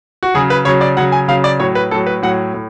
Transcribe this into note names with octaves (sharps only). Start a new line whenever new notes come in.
F#4
C#3 F#3 G#4
B4
C#3 F#3 C#5
D5
C#3 F#3 F#5
G#5
C#3 F#3 F5
D5
A2 F#3 C#5
B4
A2 F#3 A4
B4
A2 F#3 F#5
A2